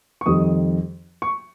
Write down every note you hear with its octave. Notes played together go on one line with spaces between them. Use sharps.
C#6
F2 D#3 G3 D#6
C#6